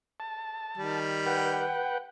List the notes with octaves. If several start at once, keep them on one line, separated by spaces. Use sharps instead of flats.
A5
D#3 G3
B4 F#5 G5